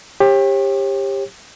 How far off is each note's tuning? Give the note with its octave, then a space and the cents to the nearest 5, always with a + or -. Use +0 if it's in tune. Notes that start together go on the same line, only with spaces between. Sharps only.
G4 +20 C#5 -40